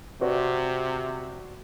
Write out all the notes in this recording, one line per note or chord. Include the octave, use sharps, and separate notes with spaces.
C3 C4 F#4 D5